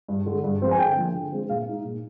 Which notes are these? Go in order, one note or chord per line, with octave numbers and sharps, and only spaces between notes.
G2
D3 G#3
G2
F3 G#3 C4 F4
G#5
D3 G5
F3 A#3 D4
D3
G#3 C4 F4
A#2 F5
G#3 D#4
A#2